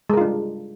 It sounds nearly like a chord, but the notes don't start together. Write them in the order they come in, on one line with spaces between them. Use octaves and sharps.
G#3 A#4 F4 D4 G3